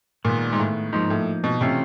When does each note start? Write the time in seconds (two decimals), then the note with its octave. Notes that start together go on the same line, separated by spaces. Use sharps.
0.25 A#2 D#3 G#3 B3
0.53 G#2
0.59 A2
0.93 G#2 F3 A#3 D#4
1.10 A2
1.44 B2
1.61 C3 E3 A3 C#4 F4